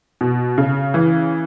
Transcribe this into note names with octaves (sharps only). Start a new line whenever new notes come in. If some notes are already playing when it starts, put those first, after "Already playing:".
B2
C#3
E3